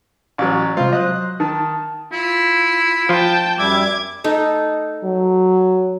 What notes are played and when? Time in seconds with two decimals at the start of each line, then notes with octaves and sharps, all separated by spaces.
0.38 A1 F#3 A6
0.76 C3 G3 G#3 C4 F4
0.93 F#3 C5 D#5 F#6
1.40 D#3 A5
2.12 E4 F4
3.09 F3 F4 G5 A5
3.58 F#2 G3 E5 D6 G#6
4.24 A3 D#4 A4
5.04 F#3